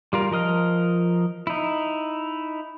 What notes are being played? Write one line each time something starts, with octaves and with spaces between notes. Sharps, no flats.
G3 F4 A#4
F3 A#4 D#5 F6
D#4 E4